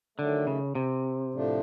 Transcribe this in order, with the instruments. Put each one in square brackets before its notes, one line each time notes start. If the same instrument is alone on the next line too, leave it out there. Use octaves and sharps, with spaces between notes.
[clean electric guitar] D3 [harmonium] D#3 F#3 A3
[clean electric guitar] C#3
C3
[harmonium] A2 F3 A3 D4